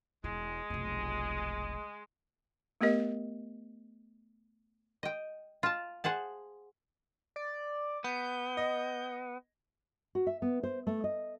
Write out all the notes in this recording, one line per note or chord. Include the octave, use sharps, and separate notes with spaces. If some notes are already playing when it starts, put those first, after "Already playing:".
E1 G#3 E4
F1 B1
A3 B3 G4 A#4 D#5
D#5 G5
F4 A5
G#4 C5 F#5 A5
D5
B3 G6
D#5
F#4
E5
B3
C5
A3
D#5